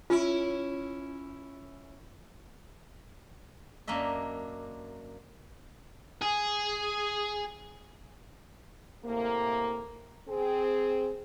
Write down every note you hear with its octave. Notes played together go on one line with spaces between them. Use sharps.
C#4 E4 F4
F#2 A#3 D4 D#5 E5
G#4
A2 C3 A#3
C4 G#4